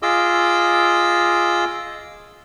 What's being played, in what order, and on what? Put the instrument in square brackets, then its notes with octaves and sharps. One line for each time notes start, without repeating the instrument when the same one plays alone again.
[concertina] F4 G#4 D#5 D6 E6